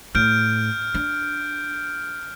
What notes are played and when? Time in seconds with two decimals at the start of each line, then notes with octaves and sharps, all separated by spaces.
0.15 A2 F6 G6 D7
0.94 D4